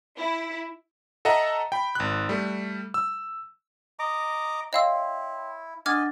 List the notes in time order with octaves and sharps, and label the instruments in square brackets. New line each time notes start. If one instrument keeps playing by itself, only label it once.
[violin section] E4
[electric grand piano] A4 D#5 E5 F#5 A#5
G5 B5
G#1 F#6
G3 A3
E6
[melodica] D#5 A#5 D6
[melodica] E4 [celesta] C#5 G5 C6 [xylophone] D#5 F5 E6
[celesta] D4 F#5 A6 [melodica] D#5 G#5 [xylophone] D6 F6 G#6